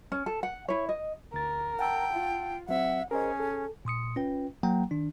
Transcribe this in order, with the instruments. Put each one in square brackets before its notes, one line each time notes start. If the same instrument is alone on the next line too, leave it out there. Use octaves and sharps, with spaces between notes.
[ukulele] C#4
A4
F#5
E4 C#5
D#5
[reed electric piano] D2 A6 [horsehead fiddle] A#4
[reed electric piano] F#5 A5 E6 [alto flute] G5
[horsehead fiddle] F4
[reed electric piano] F#3 C4 [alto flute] E5 [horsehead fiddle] F#5
[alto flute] C#4 [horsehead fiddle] G#4 [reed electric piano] A#4 C5 D#5
[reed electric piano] A4
[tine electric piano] A#2 C6 D#6 C#7
C#4 F4 B4 G5
F#3 A#3 F#5 G5 A#5
D#3 D4